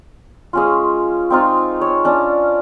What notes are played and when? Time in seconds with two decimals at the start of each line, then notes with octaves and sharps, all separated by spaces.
0.53 G#3 C#4 F4
1.30 C4 D#4 F4
1.81 C#5
2.05 C#4 D4